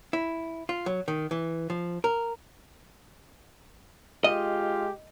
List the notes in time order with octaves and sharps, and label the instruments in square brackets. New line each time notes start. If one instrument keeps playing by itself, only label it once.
[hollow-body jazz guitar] E4
F4
F#3
D#3
E3
F3
A#4
[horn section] G#3 F4 G4 [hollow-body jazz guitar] D#5